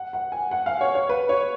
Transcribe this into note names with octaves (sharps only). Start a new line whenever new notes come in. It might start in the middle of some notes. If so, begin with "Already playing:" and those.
Already playing: F#5
F#5
G#5
F#5
F5
C#5
C#5
B4
C#5